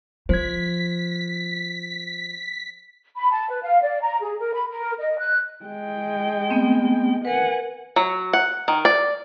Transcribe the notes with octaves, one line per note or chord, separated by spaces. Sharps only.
F3 C5 G#6 B6
B5
A5
B4
F5
D5
A#5
G#4
A#4
B5
A#4
D#5
F#6
G#3 G5
A3 B3 C4
A#4 B4 F#5 G#5
F#3
F#5
D#3
D5